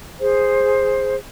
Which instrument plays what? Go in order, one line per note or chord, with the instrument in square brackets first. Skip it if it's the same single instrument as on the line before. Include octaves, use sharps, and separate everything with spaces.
[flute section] G#4 C5